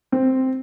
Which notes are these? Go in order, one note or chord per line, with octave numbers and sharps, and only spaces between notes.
C4